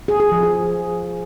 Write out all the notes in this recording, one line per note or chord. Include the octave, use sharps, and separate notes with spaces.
G#4
G#4
F3
G#4